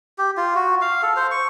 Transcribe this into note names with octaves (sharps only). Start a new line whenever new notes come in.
G4
F4
F#4
F5
A4
C5
C#6